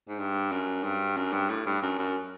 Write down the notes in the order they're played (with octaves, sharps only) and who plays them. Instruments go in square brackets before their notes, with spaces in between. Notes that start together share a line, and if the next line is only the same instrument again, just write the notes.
[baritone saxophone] G#2
G2
F#2
G2
F#2
G2
A2
G2
F#2
F#2